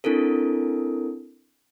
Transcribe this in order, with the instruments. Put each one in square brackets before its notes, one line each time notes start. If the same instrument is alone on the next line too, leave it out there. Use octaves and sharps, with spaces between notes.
[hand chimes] C4 D4 E4 A4 A#4